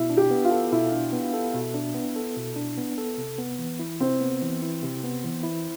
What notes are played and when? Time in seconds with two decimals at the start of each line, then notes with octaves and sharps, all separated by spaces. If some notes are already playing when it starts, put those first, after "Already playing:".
Already playing: B2 E4
0.10 D4
0.17 G4
0.31 B3
0.45 F4
0.51 A4
0.72 B2 E4
0.92 D4
1.12 B3
1.34 A4
1.54 B2
1.74 D4
1.95 B3
2.16 A4
2.37 B2
2.56 D4
2.78 B3
2.98 A4
3.18 C3
3.38 B3
3.59 E3
3.79 E4
4.00 C3 C4
4.20 B3
4.42 E3
4.62 E4
4.83 C3
5.04 B3
5.24 E3
5.43 E4